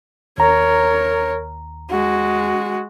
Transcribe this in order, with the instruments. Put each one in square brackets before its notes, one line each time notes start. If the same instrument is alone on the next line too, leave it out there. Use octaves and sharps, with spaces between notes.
[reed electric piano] D#2 A#5 [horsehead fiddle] A#4 C#5
[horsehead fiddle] G#3 F#4